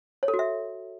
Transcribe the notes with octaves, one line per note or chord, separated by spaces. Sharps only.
C#5
A4
F#4
E5